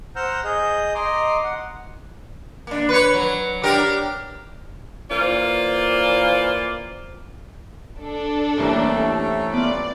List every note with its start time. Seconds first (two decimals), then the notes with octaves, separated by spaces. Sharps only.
0.16 C5 F#5 A#5 E6 F6 G6
0.44 G#4 D#5 G6
0.95 D#5 A#5 C6 D6
1.44 F#5
2.67 A#3 D4
2.89 B4 C#5
3.14 F#3
3.63 D4 G4 A#4
5.10 E3 A#3 F4 C5 D5
8.00 D4 A4
8.58 C2 C3 E3 A3 A#3 C#4 E4 A#4
9.53 B3 F4 D5